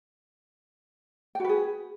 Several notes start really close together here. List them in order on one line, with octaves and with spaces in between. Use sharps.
G5 F#4 B4 G#4